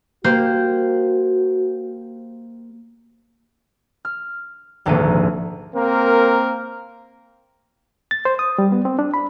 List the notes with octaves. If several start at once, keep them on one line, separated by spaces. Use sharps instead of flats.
A#3 F#4 G4 C5
F6
D#1 G#1 D2 F3 A#3 D#7
A#3 C4 A#4
A6
C5
D#6
G3
B3
C4
D4
B5